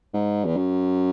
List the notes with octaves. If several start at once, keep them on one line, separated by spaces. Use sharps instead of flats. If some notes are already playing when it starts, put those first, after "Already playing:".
G#2
E2
F#2